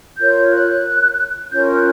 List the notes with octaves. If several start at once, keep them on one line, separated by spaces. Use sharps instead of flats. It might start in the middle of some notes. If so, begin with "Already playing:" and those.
F4 A#4 C#5 G6
F#6
C#4 F4 A#4 C#5 G6
F#6